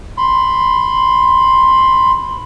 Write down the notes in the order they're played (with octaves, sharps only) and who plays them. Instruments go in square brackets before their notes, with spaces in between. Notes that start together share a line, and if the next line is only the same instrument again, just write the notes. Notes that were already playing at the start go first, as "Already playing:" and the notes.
[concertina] B5 C6